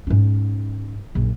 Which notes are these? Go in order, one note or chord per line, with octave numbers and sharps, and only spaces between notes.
G#2 C#4
A#1 F#2